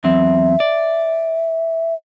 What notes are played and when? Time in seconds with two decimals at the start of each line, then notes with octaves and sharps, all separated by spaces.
0.04 E2 F#3 C4 E5
0.60 D5